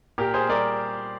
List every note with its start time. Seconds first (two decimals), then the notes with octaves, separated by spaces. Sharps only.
0.18 A#2 G4 A#4
0.34 G#4 C5
0.49 G3 A#4 D5